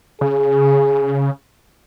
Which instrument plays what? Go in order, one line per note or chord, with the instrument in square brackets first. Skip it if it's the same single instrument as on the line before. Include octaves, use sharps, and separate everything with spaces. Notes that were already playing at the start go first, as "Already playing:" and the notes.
[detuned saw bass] C#3 [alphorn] G#4